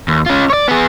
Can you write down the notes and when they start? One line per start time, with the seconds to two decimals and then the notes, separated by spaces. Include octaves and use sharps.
0.08 D#2
0.26 C#4 F4
0.50 C#5 D5
0.68 B3 G#4